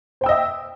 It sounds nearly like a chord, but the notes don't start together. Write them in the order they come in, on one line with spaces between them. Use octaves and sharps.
C5 G5 E6 D#5 E5